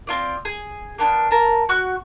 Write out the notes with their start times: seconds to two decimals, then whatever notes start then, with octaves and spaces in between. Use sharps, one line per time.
0.07 C4 F4 D5
0.45 G#4
0.98 A#3 B3 D4
1.31 A#4 A5
1.69 F#4 C#6 F#6